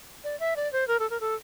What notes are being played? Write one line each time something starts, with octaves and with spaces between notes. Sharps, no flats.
D5
E5
D5
C5
A#4
A4
A#4
A4